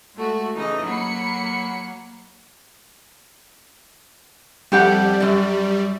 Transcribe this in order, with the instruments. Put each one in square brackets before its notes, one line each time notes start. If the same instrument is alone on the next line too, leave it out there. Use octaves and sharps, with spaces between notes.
[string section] G#3 A3 F#4
[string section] C#3 E3 [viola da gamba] D#4 D#5
[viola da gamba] F#3 A#3 [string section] B5 C7 C#7
[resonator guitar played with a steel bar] F2 G4 F#5 [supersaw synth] G3
[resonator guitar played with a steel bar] F#2 D5